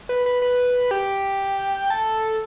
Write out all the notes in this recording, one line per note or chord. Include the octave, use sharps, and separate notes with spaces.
B4
B4
B4
G4
A4